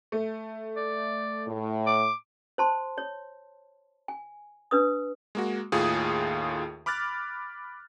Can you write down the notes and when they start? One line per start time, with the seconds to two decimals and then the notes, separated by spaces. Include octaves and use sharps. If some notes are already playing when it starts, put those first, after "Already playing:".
0.12 A3
0.76 D5
1.47 A2
1.86 D6
2.58 C5 A5 C6
2.98 C#5
4.08 G#5
4.71 D4 B4 D#6
5.35 G#3 A#3 F#4
5.72 D#2 A2 F4 G#4 D#6
6.86 B5 D6 F6 F#6 A6